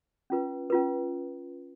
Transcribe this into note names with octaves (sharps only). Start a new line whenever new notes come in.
C#4 F4 B4
C#4 F4 B4